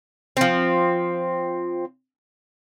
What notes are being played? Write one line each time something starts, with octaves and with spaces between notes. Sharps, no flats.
F3 C4